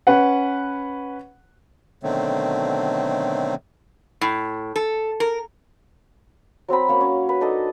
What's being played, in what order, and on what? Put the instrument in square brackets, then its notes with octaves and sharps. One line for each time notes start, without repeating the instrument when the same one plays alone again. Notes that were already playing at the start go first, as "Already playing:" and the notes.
[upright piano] C#4 B4 F#5
[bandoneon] B2 D3 D#3 F#3 A3 C4
[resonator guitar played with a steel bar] A2
A4
A#4
[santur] F#3 C4 A#5 B5
A#3 C#4 C#5
C#4
B4
D4 D#4 A4 D#5